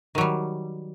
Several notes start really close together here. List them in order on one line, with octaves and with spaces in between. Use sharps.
D#3 F#3 G3